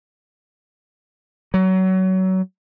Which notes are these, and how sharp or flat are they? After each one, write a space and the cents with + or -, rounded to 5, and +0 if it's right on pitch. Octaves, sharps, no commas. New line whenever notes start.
F#3 +25